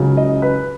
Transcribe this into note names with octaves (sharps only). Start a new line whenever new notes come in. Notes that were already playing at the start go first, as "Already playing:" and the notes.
Already playing: C#2 C#3 F#3
D#5
B4